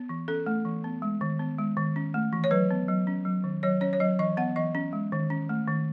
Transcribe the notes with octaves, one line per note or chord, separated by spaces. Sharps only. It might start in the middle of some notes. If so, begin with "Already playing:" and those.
Already playing: B3
E3
C#4 A4
A3
E3
B3
G#3
D#3
B3
G#3
D#3
C#4
A3
E3
C#5
F#3 B4
B3
F#3
C#4
F#3
D#3
F#3 C#5
C#4 C#5
C#5
F#3 D#5
E3 D#5
B3 F#5
E3 D#5
C#4
G#3
D#3
C#4
A3
D#3